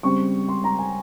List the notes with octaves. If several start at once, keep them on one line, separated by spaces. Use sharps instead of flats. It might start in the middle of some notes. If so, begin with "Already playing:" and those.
C#3 G3 C4 C#6
C6
A#5
G#5